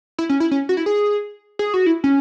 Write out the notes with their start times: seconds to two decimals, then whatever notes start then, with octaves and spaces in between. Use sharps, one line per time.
0.19 E4
0.29 C#4
0.40 E4
0.51 C#4
0.69 F#4
0.77 E4
0.86 G#4
1.59 G#4
1.74 F#4
1.86 E4
2.04 C#4